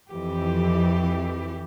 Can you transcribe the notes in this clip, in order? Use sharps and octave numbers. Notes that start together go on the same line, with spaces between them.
F2 E3 G4